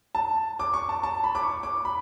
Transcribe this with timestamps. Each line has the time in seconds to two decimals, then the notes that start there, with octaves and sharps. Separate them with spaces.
0.15 A5
0.60 D6
0.74 C#6
0.89 A5
1.03 A5
1.24 B5
1.35 D6
1.43 C#6
1.63 D6
1.85 B5